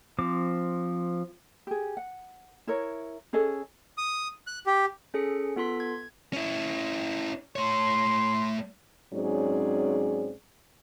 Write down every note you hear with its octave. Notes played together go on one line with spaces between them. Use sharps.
F3 C4 D6
G4 G#4
F#5
E4 A#4 C#5
C#4 G#4 A4 D#5
D#6
F#6
G4
C#4 G#4 A4 C#7
B3 F4 A4 C6 B6
G#6
C#4 E4
A3 C#5 C6
G#2 F#3 C4 C#4 G#4 D5